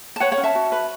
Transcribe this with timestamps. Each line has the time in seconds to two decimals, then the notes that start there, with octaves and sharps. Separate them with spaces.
0.16 A5
0.20 B4 C#5 F#5
0.32 C#5 F#5
0.38 C#4
0.43 E5 A5
0.55 F#4
0.72 B4